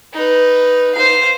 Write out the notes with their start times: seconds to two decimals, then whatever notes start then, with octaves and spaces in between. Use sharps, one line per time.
0.14 D#4 B4
0.95 C5 F5